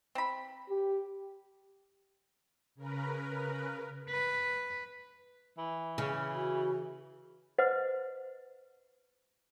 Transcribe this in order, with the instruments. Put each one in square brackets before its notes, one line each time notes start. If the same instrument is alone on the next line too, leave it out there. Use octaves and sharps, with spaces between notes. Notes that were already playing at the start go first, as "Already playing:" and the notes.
[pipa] C4 B5
[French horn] G4
[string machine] C#3 A#4 B4
[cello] B4
[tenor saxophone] E3
[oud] C#3
[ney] F#4
[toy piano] B4 C5 D#5 F#5